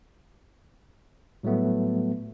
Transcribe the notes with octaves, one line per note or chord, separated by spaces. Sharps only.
A2 F#3 G3 A3 B3